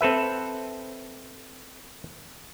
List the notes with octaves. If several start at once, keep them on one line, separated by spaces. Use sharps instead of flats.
C4 A4 B4 E5